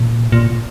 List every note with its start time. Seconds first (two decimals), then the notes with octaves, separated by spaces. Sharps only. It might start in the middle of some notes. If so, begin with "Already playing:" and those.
Already playing: A#2
0.32 A#2